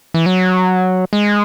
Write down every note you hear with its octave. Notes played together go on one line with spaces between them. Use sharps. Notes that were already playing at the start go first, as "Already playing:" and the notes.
E3
F#3
G#3